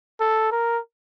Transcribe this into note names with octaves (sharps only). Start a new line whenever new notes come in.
A4
A#4